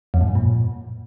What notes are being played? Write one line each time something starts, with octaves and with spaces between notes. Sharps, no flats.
F2
G#2
G2
A#2